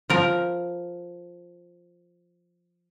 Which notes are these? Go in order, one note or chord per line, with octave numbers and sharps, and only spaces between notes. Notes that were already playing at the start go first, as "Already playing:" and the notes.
F3 A#4